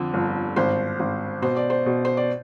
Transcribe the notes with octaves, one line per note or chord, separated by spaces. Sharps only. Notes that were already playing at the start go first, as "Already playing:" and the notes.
Already playing: F2 D3
G1
G#1 C5
G#1
B2 C5
D5
C5
B2
C5
D5